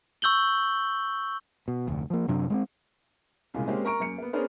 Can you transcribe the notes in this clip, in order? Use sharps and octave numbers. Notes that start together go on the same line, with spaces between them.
C#6 E6 G6 F#7 G7
B2
F1 D2
F3 A#3
F#2 C3 F#3 D4
G#3 A3 C4
C2 A#2 C#3 G#3
G#3 A#3 C4 C#4 G4
A#4 A#5 C#6 D7
F#2 A#3 C#7
A#3 B3
B3 C#4 D4 G#4 A#4 C5